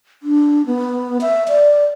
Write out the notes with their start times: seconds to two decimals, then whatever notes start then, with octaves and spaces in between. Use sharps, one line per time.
0.23 D4
0.66 B3
1.21 E5
1.48 D5